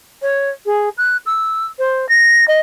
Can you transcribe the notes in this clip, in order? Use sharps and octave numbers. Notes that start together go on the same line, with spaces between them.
C#5
G#4
F#6
E6
C5
A#6
D#5